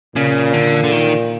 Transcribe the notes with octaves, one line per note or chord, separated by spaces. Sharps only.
A#2 C#3
D3
D3
D#3